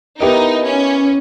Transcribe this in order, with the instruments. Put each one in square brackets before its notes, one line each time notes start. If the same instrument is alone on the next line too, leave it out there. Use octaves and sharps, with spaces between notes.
[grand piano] B3 E4 G4 A#4 D#5 [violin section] D#4
[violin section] C#4